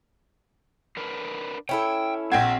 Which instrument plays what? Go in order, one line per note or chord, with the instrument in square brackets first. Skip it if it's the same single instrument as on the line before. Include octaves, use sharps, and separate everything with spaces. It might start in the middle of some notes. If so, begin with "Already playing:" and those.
[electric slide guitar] D4 A#4 B4
[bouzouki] C#4 E4 A4 [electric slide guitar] G5
[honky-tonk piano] A#1 G5 G#6 [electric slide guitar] C4 [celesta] F#5